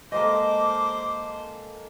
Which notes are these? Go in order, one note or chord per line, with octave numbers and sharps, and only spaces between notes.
G#3 A#3 A4 C5 D#5 D6